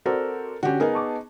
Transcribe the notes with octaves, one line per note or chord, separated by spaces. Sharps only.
C4 F#4 A4 A#4 D5
D3 C#4 F#4 G4
B3 D#4 G#4 A#4
A5 C#6 D6